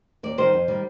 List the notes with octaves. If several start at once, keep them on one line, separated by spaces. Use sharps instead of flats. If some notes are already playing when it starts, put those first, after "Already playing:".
D#2 D5
D#3 G3 C5
F2
D#3 G3